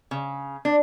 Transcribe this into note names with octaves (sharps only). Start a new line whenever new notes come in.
C#3
D4